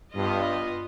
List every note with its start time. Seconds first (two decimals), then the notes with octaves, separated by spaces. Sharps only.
0.14 G2 B3 F4 D#5